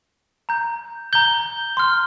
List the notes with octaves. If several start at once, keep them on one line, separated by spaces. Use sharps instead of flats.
A#5 G6
A#5 G6 G7
C6 F6